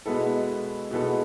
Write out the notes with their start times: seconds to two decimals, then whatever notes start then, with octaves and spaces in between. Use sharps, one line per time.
0.06 B2 G#3 B3 E4 A4
0.91 B2 G#3 B3 E4 A4